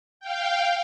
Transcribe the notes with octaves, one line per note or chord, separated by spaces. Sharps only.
F5 G5